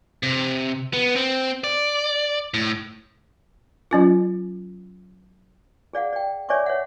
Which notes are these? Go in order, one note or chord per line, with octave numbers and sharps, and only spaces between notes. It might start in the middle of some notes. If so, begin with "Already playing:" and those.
C3
B3
C4
D5
A2
F#3 C#4 F4
G#4 D5 F5 F#5
D5 G5
C#5 D5 E5 G#5 C#6 D6
C#5 E5 F#5